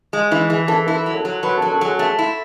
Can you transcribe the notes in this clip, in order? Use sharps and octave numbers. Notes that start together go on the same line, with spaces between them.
G#3
E3 E4 E5
E3 G#4 G#5
E3 A4 A5
E4 A4 A5
F#3
A4 A5
F#3
F#3 B4 B5
F#3 A4 A5
A4 A5
F#3 G#4 G#5
A3 A4 A5
E4